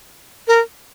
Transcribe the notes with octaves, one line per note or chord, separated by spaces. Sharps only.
A#4